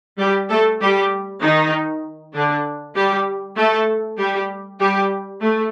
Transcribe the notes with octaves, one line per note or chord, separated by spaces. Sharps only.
G3 G4
A3 A4
G3 G4
D#3 D#4
D3 D4
G3 G4
A3 A4
G3 G4
G3 G4
A3